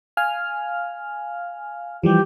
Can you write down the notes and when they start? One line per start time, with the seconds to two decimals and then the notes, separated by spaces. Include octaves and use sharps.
0.17 F5 G#5 F6
2.03 E3 F3 G3 G4